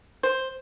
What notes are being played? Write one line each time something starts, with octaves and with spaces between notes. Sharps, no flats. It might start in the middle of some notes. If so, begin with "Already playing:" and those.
C5